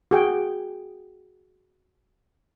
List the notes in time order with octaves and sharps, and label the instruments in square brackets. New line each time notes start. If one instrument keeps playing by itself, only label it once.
[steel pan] F#4 G#4 G5